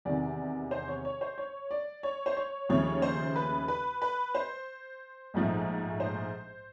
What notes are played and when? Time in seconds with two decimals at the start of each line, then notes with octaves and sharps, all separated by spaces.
0.05 E2 C3 D#3 D5
0.71 C5
0.88 C#5
1.05 C#5
1.21 C5
1.38 C#5
1.71 D5
2.03 C#5
2.26 C5
2.37 C#5
2.69 D#2 C#3 F3 A3 C#5
3.02 C5
3.36 B4
3.68 B4
4.02 B4
4.35 C5
5.34 A#1 G#2 F3 A3
6.00 C5